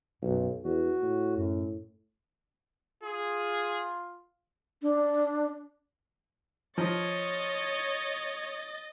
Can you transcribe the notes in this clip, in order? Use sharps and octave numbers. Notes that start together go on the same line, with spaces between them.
B1 F#2
E2 F#4
A2
F#2
F4 G#4
D4
F3 C#5 D#5 A6